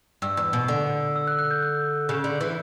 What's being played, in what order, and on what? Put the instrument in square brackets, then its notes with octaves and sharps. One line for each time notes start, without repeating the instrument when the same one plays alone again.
[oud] G2 [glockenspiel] E6
[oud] E2
B2
D3
[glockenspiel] E6
F#6
F#6
G6
F#6
[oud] C#3
D3
E3